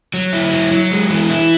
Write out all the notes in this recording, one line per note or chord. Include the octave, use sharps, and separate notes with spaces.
F#3
E4
F#3
F#3
G#3
E3
E4